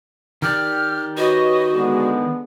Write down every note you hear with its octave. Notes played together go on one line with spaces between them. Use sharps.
D#3 G4 D5 F6
F#4 B4 C#5 D#5
D3 G#3 B3